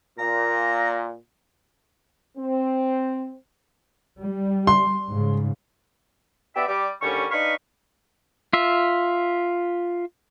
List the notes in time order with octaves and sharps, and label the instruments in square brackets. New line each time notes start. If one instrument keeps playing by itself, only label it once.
[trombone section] A#2 [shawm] A#5
[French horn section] C4
[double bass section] G3
[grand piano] C6
[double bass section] G#2 C#3
[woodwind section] B3 G4 D5 E5
G3 D6
D#2 D3 G3 C#4 C#6
D4 D#4 B4 F5 B5 C#6
[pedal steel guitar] F4 E5